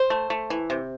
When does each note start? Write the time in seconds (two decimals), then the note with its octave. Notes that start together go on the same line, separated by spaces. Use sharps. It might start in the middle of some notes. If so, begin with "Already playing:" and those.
Already playing: C5
0.10 A3
0.30 A3
0.50 E3
0.70 C3